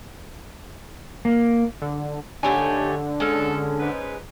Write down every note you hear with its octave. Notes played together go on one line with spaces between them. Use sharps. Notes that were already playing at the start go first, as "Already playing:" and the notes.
A#3
D3
D#2 D3 A3 D#4 G4 C#5 G#5
G#3 C#4 A4
G#2 B4